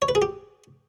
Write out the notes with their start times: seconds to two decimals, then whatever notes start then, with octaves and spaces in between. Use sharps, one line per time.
0.02 C#5
0.09 B4
0.15 G#4
0.22 G4